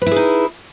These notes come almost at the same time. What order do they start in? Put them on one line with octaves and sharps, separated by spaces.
B4 E4 G#4 D#4